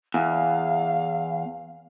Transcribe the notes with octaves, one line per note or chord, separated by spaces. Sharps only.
E2 F5